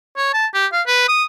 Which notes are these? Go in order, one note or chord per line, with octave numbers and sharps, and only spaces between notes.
C#5
A5
G4
F5
B4
D#6